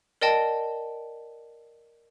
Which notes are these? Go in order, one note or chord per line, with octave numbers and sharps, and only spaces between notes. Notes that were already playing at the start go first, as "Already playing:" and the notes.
A#4 D5 D#5 G5 A5